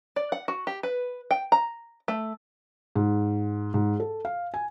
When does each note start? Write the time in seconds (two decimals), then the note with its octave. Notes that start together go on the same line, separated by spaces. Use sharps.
0.16 D5
0.32 F#5
0.48 F#4
0.67 G4
0.83 B4
1.31 G5
1.52 A#5
2.08 A3
2.95 G#2
3.74 G#2
4.00 A4
4.25 F5
4.54 G#5